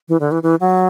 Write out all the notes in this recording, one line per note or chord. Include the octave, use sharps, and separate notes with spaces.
E3
D3
E3
E3
F#3